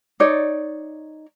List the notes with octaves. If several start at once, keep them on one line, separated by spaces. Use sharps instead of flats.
D#4 C#5 D5